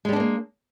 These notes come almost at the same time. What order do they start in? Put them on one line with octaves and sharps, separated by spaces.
G#3 G3 D4 C4 A#3